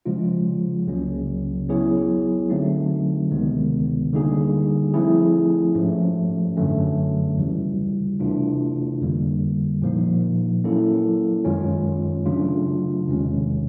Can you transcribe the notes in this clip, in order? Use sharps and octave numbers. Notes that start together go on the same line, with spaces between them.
C#3 F3 G#3 C#4 F4
C#2 C#3 F#3 A#3 C#4
F#3 B3 E4 G#4 C#5
D3 F#3 A3 C4 D#4
D2 C3 D#3 G#3 B3
D3 G3 A#3 D#4 G#4
F3 A3 C4 E4 G#4
G#2 F3 A3 C#4
F#2 D3 F#3 A3 C#4
D#2 C#3 E3 G3
C3 E3 A3 D4 F4
F2 D3 G3 A#3
A#2 F3 A#3 D#4
F#3 A#3 C#4 E4 A4
F#2 D#3 G#3 C#4 F4
C#3 F#3 A3 D4 F4
E2 C3 D#3 G#3 C#4